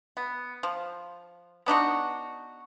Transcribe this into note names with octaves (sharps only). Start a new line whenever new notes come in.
B3
F3
B3 D4 D#4 F#4